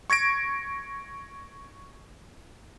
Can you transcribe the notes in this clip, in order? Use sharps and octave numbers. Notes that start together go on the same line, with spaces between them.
C#6 G#6 A#6 D7